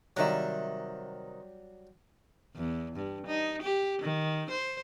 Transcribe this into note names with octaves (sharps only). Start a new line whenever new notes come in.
C3 D#3 F#3 G3 E5
E2
G2
D#4
G4
D#3
C5